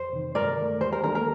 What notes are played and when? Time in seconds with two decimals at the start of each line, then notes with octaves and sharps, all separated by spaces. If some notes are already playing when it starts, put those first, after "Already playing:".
Already playing: F2 C5
0.13 C3 D#3
0.35 G2 A#4 D5
0.58 D#3 A3
0.81 D#2 C5
0.92 A#4
1.04 D#3 A#3 D4 A4 A#4
1.15 A#4